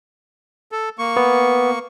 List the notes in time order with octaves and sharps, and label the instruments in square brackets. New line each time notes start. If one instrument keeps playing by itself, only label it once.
[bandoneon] A4
A#3 C#6
[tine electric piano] B3